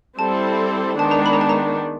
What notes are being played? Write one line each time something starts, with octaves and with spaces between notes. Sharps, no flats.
G3 C4 E4 A4 C5 A5
D#3 G#3 B3 D4 A5
A#5
B5
A#5
A5
A#5